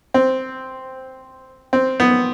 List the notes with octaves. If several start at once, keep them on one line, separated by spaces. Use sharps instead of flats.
C4
C4
B3